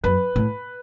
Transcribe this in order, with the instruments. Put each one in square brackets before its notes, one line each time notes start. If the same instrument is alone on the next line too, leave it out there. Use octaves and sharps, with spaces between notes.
[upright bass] F#2 [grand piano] B4
[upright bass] A2